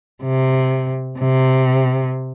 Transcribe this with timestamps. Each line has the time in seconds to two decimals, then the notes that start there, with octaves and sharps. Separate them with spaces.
0.23 C3
1.19 C3